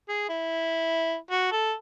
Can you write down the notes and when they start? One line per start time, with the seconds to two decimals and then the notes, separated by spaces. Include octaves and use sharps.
0.09 G#4
0.29 E4
1.31 F#4
1.52 A4